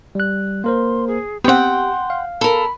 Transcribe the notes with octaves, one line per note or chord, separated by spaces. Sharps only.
G3 F#6
A#3 A#4 C5 C6
G#4
B3 C4 G4 F#5 G5 C6
F5
A4 A#4 B5